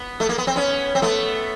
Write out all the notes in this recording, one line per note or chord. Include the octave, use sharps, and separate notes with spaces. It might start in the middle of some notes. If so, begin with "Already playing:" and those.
Already playing: B3
A3
A#3
B3
C4
B3 C#4
C4
A3 B3